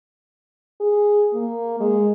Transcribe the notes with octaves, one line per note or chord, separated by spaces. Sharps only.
G#4
A#3
G#3